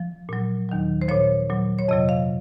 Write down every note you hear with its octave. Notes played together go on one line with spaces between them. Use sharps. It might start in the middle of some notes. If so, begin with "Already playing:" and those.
Already playing: F3
A#2 F#3
D#2 D#3 F#3
C5
A#2 F3 C#5
A#2 F#3
C#5
F2 C3 F#3 D#5
F5